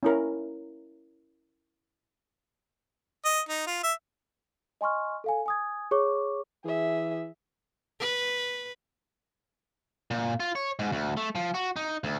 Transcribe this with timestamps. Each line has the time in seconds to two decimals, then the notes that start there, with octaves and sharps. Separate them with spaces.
0.03 C#4 E4 A#4
3.25 D#5
3.49 D#4
3.67 F4
3.84 E5
4.81 D#5 G#5 C6 C#6 F6
5.24 A4 F5 G#5
5.46 G#5 D#6 G#6
5.91 G#4 C#5 C#6 D6
6.64 E3 G#4 E5
8.00 B4
10.11 A#2
10.40 F4
10.55 C#5
10.79 G#2
10.92 D2
11.17 A3
11.35 F3
11.54 F#4
11.76 D#4
12.04 D2